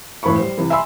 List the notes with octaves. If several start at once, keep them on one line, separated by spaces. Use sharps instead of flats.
E1 A2 E3 C5 B5 C#6
G3 C5
C3 E3
E5 G#5 B5 C6 E6